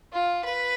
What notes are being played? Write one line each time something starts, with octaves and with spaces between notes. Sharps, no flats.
F4
B4